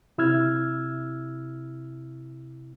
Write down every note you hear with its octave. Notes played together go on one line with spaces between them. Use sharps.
C3 E4 E6 F6 G#6